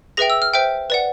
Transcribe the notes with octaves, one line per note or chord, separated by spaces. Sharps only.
G#4 B4 E5 G5 A#6
E6
F6
C5 E5 G5
B4 D5 F#5